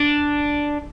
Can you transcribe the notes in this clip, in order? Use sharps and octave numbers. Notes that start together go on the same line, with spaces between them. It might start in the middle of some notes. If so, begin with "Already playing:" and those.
Already playing: D4